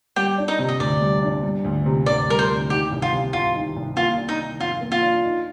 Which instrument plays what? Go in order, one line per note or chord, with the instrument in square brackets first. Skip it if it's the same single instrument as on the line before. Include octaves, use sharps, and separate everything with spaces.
[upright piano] G3 [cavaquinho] G4 G5
[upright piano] D4
[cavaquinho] D#4 D#5
[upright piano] C3
[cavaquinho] D#5
[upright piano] D2 [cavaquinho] D5
[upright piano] G3
D4
G3
D2
C3
[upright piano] D2 [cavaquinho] D5
[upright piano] G3 [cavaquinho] A#4
[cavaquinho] C5
[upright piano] D2
[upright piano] D#3 [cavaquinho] G4
[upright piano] C2
[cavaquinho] F4
[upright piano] C3
[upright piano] C2 [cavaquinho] F4
[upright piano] D#3
C2
[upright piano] A#3 [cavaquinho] F4
[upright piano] D4
[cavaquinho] D#4
[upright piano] D#3
[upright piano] F2 [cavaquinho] F4
[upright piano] A#3
[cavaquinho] F4
[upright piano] D4
D#4